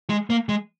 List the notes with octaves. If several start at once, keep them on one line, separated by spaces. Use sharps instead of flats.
G#3
A#3
G#3